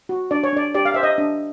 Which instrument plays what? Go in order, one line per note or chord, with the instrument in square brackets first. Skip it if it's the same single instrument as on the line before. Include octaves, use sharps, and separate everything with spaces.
[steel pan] F#4
D4 D5
C#5
D4 D5
G4 D5
F5
C5 E5
D#5
D4